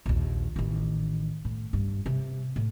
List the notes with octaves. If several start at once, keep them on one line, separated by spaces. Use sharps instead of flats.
A#1 D#2
A1 D#3
A2
G2
C3
A2